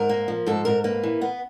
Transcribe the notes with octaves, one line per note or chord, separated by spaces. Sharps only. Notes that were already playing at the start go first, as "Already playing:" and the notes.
Already playing: G#2 A#4
A#3
F3
G#2 A4
G#2 A#4
A#3 B4
E3
B3